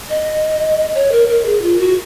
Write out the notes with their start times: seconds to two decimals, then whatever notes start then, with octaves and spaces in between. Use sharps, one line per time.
0.10 D#5
0.95 C#5
1.12 A#4
1.28 A#4
1.46 G#4
1.62 F4
1.79 F#4